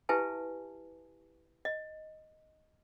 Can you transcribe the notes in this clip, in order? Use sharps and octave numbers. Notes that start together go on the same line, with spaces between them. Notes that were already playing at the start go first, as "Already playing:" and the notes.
E4 G4 B4 E5 G#5 A5
D#5